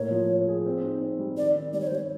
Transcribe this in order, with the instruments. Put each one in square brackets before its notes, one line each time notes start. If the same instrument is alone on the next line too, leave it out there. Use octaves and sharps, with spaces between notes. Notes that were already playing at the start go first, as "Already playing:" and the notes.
Already playing: [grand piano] A2 A#3 [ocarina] C#5
[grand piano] F3
A#3
G#4
C4
D#4
C4
G3
[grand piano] D#3 [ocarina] D5
[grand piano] D#3
[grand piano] G3 [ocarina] D5
[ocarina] C#5
C5
[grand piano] G3 [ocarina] C#5